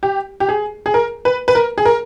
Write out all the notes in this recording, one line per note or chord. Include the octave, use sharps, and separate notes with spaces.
G4
G4
G#4
G#4
A#4
B4
B4
A#4
G#4
A#4